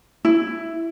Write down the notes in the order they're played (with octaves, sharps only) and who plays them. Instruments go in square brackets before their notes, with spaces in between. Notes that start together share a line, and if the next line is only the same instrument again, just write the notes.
[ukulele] E4